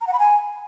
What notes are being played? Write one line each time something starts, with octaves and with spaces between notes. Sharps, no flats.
A#5
F#5
B5
G#5